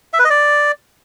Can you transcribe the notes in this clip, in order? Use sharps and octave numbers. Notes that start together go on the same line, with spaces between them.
E5
B4
D#5
D5